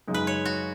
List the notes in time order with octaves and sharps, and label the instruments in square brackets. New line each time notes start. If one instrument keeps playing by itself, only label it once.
[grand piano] F#2 C#3 G#3 D#4
[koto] B4
C#5
F#4